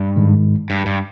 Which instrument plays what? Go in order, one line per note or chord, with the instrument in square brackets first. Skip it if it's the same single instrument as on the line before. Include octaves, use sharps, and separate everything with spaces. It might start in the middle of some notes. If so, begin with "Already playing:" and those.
Already playing: [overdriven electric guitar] G2
[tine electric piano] G#2 D#3 G#3
[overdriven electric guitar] G2
G2